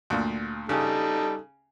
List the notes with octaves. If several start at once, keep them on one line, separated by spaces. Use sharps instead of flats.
D2 A#2
C#3 G3 D#4 A4